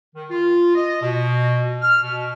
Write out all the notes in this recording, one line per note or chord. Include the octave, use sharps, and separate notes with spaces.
D#3
F4
D#5
B2
F6
B2